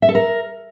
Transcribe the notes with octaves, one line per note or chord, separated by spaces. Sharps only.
E5
A4
A#4